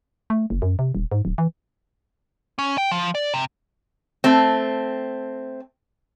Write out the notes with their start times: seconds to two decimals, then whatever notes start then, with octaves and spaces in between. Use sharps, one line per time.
0.30 A3
0.50 F#1
0.62 F#2
0.79 C3
0.95 D#1
1.12 G#2
1.25 D1
1.38 E3
2.59 C#4
2.78 G5
2.91 F3
3.15 D5
3.34 C3
4.24 A3 C4